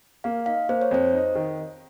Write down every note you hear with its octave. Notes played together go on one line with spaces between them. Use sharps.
A#3 F5
D#4 F5
A#3 C5
C#5
F2 C5
D#4
D#3